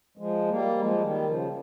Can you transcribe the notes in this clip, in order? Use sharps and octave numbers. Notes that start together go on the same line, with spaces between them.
F3 G#3
G3 A#3
F3 G#3
D#3 G3
C#3 F3